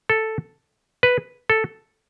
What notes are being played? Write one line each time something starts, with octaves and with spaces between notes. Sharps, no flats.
A4
B4
A4